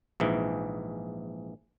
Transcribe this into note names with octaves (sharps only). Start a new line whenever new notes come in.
A#1 G#2 E3